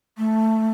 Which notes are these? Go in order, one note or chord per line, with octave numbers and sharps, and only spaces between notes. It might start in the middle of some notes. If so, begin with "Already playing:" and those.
A3